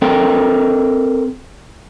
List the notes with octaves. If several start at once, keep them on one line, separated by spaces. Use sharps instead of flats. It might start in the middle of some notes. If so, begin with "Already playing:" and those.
C4 A4 A#4 G5